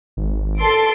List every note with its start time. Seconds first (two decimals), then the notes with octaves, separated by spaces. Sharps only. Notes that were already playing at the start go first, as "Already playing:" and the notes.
0.17 G#1
0.60 A4 C6 D7